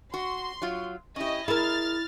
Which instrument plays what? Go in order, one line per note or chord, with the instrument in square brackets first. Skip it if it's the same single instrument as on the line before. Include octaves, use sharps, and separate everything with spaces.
[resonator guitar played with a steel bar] F#4 [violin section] C6
[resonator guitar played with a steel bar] F#3 F4
[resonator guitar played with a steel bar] C#4 G4 [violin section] E4 D#5
[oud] E4 [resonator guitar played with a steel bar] G#4 A#4 [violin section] F6 A6